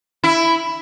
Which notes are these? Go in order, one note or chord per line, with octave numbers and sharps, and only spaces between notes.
E4